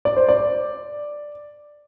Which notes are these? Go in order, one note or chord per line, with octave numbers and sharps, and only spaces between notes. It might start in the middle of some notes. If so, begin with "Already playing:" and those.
D5
C5
D5